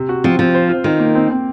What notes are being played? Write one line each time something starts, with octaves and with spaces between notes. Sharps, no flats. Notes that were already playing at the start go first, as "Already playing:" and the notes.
Already playing: C3
F#4
F3 C4
F3 C4
C5
F4
D#3 F4
A#3
C4
C4